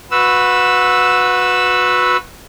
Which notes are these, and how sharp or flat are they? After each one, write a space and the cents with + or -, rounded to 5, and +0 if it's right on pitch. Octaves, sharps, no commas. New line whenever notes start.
F#4 -25 B4 +0 E6 -5